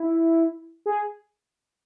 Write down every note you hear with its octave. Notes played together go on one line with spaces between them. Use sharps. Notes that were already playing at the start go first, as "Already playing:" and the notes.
Already playing: E4
G#4